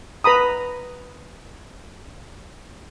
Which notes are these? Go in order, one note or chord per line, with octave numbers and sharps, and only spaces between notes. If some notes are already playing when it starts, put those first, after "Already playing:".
B4 A#5 B5 D#6